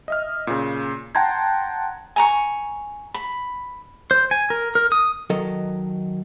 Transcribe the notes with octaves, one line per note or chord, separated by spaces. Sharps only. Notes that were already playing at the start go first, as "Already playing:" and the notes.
D#5 E5 F6
A#2 C#3
F#5 G5 A5 A#5 C6 G#6
G#5 A#5 C#6
B5
C5
G#5
A#4
A#4
D#6
D#3 F#3 A4 A#4 D#5